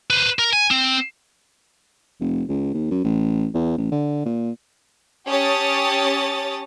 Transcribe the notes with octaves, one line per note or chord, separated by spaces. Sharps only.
B4 C5
A#4
G#5
C4
F1
C#2
D#2
F#2
A1
E2
A1
D3
A#2
C#4 G4 C#5 A5 D#6 A6